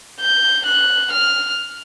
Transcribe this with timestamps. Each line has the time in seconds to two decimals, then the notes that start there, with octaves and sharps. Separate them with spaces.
0.21 G6
0.66 F#6
1.12 F6